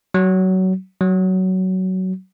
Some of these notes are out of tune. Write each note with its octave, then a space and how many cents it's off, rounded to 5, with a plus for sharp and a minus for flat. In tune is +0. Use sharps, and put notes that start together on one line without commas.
F#3 +20
F#3 +15